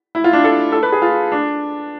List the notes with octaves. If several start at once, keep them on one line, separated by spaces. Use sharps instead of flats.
E4
F4
D4
A4
A4
B4
G#4
F4
D4